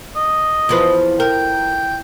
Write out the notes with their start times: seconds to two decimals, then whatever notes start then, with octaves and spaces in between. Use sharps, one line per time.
0.16 D#5
0.69 E2 F3 B4
1.20 A#4 G5